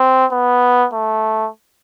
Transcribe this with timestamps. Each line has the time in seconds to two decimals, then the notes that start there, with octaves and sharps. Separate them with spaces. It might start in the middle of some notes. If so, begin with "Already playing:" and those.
Already playing: C4
0.32 B3
0.94 A3